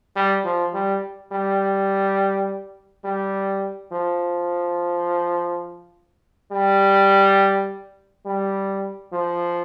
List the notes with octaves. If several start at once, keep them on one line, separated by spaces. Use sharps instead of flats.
G3
F3
G3
G3
G3
F3
G3
G3
F3